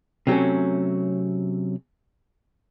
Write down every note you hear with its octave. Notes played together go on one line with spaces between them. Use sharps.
C3 F#3 A3 C#4